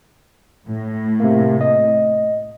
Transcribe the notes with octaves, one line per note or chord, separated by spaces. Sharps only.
A2
C3 A#3
D#5